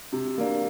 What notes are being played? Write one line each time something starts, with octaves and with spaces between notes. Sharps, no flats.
C3
A#3 D4